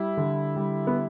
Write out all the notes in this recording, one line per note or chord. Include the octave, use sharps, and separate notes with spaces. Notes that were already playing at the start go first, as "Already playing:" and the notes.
Already playing: G3 E4
D3
G3
B3